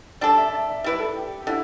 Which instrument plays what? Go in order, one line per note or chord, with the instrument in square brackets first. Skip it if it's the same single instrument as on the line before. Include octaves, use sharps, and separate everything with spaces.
[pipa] G3 D4 A4 [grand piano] D5
[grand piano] E5
E5
D5
E5
[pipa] G3 E4 B4 [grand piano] D5
[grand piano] A4
G4
G4
[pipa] D3 [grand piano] E4